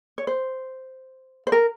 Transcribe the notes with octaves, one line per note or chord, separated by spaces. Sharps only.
C#5
C5
C5
A#4